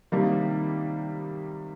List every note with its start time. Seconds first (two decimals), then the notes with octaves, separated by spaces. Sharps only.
0.12 C3 D#3 G3 A#3